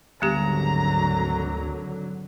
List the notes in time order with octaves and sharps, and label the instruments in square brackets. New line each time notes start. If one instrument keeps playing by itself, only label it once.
[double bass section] G#1 D3 F#3 [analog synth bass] D2 [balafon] G3 B3 G4 [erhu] A#5